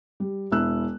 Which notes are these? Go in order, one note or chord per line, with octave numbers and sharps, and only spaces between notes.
G3
E1 E4 E6 F#6